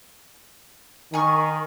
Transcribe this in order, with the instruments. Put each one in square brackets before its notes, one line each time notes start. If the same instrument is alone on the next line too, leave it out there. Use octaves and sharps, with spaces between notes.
[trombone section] D#3 [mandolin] G#5 C#6